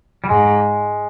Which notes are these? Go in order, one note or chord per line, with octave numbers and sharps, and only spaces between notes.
G3
G#2 G#3